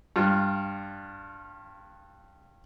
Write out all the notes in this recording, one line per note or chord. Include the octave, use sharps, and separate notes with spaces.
G2 F4